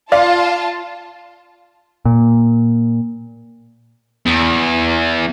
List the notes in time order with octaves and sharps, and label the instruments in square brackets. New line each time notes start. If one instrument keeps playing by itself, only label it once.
[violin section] F4 A5 [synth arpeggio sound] D5 [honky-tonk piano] F5
[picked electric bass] A#2
[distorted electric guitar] E2